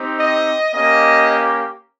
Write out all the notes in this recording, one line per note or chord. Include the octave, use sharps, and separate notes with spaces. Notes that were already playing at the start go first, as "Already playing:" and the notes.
Already playing: C4 D#4 G4
D#5
A#3 C#4 G4 D#5